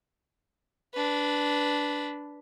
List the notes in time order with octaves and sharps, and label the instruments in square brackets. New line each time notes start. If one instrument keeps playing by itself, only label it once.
[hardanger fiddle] D4 B4